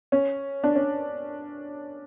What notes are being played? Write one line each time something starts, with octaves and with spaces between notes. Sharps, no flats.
C#4
D4
C#4